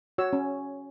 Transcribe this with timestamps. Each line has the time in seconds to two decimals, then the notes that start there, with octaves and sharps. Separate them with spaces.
0.18 F#4 C#5 E6
0.33 C#4